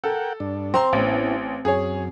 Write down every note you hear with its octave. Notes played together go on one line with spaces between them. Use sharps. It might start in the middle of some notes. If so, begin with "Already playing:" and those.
A4 A#4 F#5 G5
G2 D4
C4 A#5 C6
A1 B3 C#4 E4
F#2 G#4 C#5